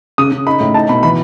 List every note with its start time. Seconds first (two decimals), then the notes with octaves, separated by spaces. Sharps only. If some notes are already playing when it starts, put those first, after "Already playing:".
0.18 C#3 D#6
0.32 C#3
0.47 D#4 B5
0.60 A2
0.74 D#4 A5
0.89 B2 B5
1.03 E3 B5